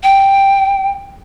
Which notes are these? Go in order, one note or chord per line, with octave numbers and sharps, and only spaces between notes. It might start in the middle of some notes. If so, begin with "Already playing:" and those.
G5